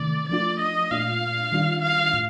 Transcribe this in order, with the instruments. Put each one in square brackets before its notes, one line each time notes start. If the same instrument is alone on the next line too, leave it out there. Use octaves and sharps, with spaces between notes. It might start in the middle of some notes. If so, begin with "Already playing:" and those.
Already playing: [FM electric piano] C3 D#3 A3 [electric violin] D5
[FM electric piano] F3 A3 D4 F4 [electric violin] D5
[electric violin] D#5
[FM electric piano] A#2 A3 D4 F4 [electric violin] F5
[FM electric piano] D#3 G3 D4 F4
[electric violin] F5
[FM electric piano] A2